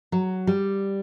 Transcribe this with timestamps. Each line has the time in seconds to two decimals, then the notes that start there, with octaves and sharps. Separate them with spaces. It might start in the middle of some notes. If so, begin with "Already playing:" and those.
0.12 F#3
0.47 G3